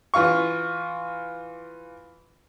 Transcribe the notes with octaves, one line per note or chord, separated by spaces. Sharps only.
E3 F4 F5 C#6